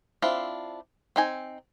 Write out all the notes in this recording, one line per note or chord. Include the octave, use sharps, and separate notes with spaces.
C4 D4 E4 F4
C4 D#4 G#5